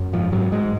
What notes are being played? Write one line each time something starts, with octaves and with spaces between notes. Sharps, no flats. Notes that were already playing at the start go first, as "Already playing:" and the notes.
Already playing: F#2
G#2 F3
G#2 F#3
G#2 G#3